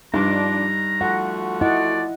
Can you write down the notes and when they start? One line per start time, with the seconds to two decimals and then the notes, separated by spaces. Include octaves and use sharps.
0.14 G2 F3 D4 D#4 A#5
1.01 F3 A3 F#4 F#5
1.61 E4 D5 D#5 F#5